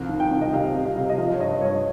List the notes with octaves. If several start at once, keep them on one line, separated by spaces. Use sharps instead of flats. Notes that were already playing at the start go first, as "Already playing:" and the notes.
Already playing: C2 F3 F5
D#3
G5
C2
D#5
C3 F5
C3
F5
C3
D#5
F3 F5
C#5
G2 D#5
G2 C#5